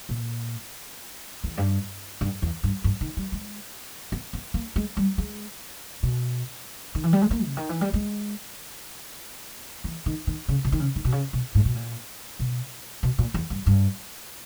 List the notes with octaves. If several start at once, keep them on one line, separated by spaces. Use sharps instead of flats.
A#2
E2
G2
G2
E2
G2
G2
D#3
G3
G#3
B3
B3
A#3
G#3
G3
G#3
B2
D#3
E3
G3
G#3
A#3
C#3
D#3
E3
G3
G#3
E3
D#3
D#3
C#3
B2
D#3
C#3
D#3
B2
C#3
B2
G#2
B2
A#2
B2
B2
A#2
E2
G2
G2